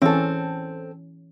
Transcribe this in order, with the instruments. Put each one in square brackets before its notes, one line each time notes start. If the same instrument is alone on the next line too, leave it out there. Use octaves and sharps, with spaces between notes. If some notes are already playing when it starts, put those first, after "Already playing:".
[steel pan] E3 C#4 [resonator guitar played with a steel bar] C4 A4